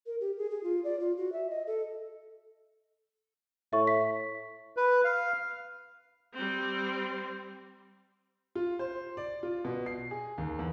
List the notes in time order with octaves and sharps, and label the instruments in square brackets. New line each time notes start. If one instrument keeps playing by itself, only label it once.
[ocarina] A#4
G4
G#4
G#4
F4
D5
F4
F#4
E5
D#5
A4
[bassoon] A2 [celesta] E5 C#6
[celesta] B6
[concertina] B4
F5
[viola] G3 C4
[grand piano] F4
C5
D5
F4
B2
C7
G#4
D#2
E2